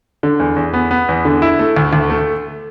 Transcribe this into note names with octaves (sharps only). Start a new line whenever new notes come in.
D3
E2
E2
B3
B3
E2
D3
E4
A3
D2
D2
A3